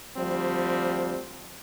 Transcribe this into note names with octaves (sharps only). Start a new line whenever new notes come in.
D2 F3 G3 C4